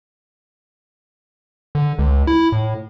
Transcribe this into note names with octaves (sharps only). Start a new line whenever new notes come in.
D3
C#2
E4
A2